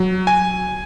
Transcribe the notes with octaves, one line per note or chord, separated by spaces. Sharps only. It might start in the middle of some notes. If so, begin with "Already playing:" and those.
Already playing: F#3
G#5